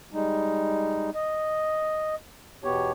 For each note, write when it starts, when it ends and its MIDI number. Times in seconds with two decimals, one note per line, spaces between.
0.13 1.10 55
0.13 1.10 56
0.13 1.10 63
1.14 2.15 75
2.64 2.92 40
2.64 2.92 47
2.64 2.92 59
2.64 2.92 67
2.64 2.92 73